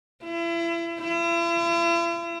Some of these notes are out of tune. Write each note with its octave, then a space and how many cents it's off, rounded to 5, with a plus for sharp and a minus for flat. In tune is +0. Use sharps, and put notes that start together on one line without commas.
E4 +35
E4 +45